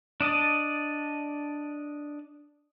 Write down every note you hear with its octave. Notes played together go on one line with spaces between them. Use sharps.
D4 D5 D#5 A5